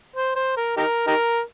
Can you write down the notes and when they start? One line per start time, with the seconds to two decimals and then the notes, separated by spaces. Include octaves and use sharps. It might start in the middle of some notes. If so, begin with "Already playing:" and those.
0.16 C5
0.36 C5
0.57 A#4
0.77 D#4 G4 A#4
1.07 D#4 G4 A#4